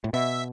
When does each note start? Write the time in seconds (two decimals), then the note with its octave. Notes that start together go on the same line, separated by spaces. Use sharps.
0.04 A2
0.13 B2 E5